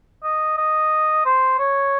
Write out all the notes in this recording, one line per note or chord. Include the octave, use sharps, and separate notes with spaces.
D#5
D#5
C5
C#5